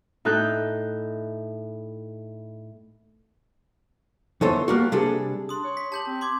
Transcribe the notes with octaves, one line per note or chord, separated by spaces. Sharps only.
A2 D#4 A4 F#6 G6
E3 B3 D#4 A4 C5 C#5
G3 A#3 F#4
C3 G3 D4 G#4 A4
D4 C6 D#6
C#5
B6
G4 A5 G6 F#7
C4
C6 D6 G#6